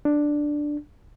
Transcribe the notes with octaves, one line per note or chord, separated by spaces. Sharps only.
D4